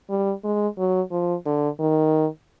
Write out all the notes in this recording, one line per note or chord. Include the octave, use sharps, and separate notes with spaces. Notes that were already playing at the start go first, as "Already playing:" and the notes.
G3
G#3
F#3
F3
D3
D#3